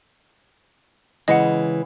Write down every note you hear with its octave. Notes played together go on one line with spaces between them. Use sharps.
C#3 E3 G#3 D#5 F#5